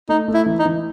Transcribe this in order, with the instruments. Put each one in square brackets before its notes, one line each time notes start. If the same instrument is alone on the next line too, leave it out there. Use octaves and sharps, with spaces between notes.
[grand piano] A3 [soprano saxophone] D#4
[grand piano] A3
[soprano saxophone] E4
[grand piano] E3
[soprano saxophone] D#4
[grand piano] E3